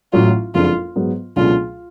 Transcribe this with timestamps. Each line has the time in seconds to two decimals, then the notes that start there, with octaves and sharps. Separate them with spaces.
0.13 A1 A2 F#3 F4
0.55 F#1 F2 F3 G#3 D4 F4
0.96 G#2 F#3 B3
1.36 C#2 B2 F#3 A3 D4 F4